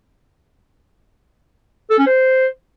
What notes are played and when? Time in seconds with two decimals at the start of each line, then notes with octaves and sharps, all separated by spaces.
1.90 A4
1.98 C#4
2.06 C5